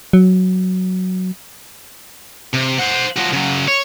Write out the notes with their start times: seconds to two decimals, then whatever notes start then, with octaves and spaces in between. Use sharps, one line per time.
0.13 F#3
2.53 C3
2.79 C5 F#5
3.16 F3 F#4
3.33 C#3 F#3
3.68 C#5